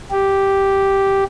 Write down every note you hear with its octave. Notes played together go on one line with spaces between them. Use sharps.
G4